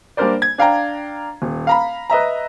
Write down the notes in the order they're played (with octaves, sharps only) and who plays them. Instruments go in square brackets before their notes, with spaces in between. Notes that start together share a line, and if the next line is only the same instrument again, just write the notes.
[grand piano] G3 A#3 D4 A#4 C5 D5
G#6
D4 F5 G5 A#5
D#1
F5 A#5 B5
B4 D#5 E5 A#5